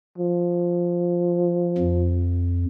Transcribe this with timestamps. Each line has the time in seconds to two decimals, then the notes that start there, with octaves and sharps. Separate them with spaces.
0.18 F3
1.78 F2